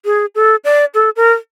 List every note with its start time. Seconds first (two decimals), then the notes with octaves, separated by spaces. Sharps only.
0.05 G#4
0.35 A4
0.65 D5
0.94 A4
1.16 A#4